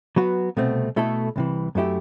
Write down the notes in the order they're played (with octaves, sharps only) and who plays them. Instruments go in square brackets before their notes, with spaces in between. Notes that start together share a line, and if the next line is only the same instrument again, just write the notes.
[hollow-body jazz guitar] F#3 B3 F#4 B4
C2 B2 A3 C4
B2 A3 E4 A4
C2 C3 E3
F#2 F#3 A3 E4 G4